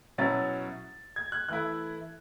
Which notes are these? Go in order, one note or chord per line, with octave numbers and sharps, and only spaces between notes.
B2 F#3 C#4 E4 A6
G#6
F#6
E3 A3 E4 F#6